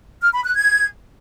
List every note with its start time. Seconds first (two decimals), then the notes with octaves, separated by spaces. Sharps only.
0.22 F6
0.33 B5
0.44 F#6
0.55 G#6